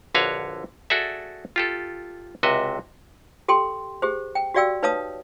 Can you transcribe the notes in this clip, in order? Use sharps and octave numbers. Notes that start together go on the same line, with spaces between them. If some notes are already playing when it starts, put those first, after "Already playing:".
A#1 D3 F#4 B4 C#5 F5
F#4 G#4 A4 D5 E5
F4 G4 A4
C#2 C3 F#4 D#5 E5
G4 A4 G5 C6
G4 G#4 C5
G5
F#4 G4 D5 F5 G5 E6
D#4 B4 C#5 F5 A5 D#6